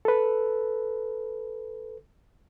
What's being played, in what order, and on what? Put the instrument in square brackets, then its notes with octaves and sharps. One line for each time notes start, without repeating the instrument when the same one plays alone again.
[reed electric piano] A4 B4